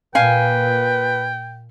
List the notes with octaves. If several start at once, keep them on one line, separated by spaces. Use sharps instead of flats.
A#2 B4 F5 G5 G#5